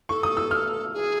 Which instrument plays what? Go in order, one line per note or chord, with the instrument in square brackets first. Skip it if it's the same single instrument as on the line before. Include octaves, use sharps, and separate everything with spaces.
[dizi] A4 [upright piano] C#6
[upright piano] D#6
E6
F6
[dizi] G#4